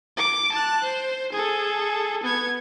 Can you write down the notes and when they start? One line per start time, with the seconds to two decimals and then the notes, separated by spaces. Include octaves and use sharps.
0.17 D6
0.52 A5 F#6
0.83 C5
1.32 G#4 A4
2.23 B3 G#6